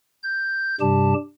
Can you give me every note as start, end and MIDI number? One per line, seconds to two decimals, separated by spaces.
0.23 0.76 91
0.81 1.14 43
0.81 1.14 48
0.81 1.14 55
0.81 1.14 67
0.81 1.14 81